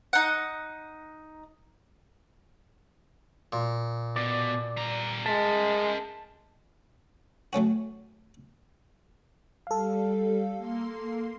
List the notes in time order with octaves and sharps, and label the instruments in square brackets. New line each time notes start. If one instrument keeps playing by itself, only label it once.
[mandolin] D#4 F#5
[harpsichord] A#2
[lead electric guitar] B2 [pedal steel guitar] D5
[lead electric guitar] G3 A#5
[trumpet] G#3 [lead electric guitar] A#4 E5 [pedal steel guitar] A5
[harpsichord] F#3 A3 C#4 F#4
[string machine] G3 [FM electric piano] A4 F5
[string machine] A#3 C6